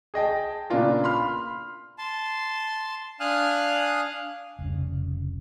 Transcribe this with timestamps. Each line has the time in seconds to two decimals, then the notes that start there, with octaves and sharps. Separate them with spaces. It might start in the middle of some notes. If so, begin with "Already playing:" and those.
0.14 G#4 D#5 G5 A5
0.70 A#2 C#3 B3 D4 F4 A#4
1.04 B5 C6 F6
1.98 A5 C6
3.20 D4 F5 G#5 D#6 F6 F#6
4.59 F1 C2 C#3